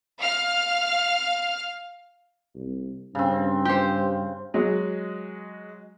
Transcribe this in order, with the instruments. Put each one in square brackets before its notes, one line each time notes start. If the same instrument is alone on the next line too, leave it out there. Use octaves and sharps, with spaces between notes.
[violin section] F5 F6
[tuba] C2
[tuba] G2 [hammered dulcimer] C#3 C4
[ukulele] G4 C5
[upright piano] F#3 G#3